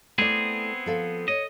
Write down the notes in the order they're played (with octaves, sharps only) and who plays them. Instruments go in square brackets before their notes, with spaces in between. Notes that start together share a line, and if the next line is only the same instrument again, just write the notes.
[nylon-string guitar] A3 E4 D5 [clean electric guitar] B3 C4 G#4
[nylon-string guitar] F3 A4 F5
[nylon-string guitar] C#5 [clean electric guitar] D#5